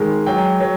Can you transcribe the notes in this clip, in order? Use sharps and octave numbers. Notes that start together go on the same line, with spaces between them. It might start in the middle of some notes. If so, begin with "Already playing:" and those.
Already playing: D#3 G#3
F#3 G5
F#3